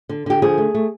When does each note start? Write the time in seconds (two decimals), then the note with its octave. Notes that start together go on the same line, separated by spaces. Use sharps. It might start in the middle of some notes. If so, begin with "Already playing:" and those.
0.09 D3
0.26 D3 G4
0.42 F3 G#4
0.58 A3
0.75 A3